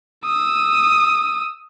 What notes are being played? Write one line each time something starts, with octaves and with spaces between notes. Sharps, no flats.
D#6 E6